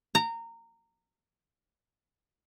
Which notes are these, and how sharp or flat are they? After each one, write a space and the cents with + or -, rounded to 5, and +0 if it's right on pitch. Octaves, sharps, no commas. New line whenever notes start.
A#5 -20